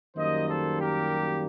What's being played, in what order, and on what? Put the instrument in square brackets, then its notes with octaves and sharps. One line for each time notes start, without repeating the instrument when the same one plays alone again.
[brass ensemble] F#2 D#3 G3 A#3 C5 D#5
A4 C5
G4 A#4